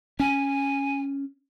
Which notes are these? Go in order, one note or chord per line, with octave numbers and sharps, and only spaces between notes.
C#4 G#5